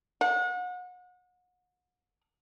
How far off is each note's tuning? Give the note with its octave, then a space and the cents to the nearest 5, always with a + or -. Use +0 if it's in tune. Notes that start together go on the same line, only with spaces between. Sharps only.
F#5 -35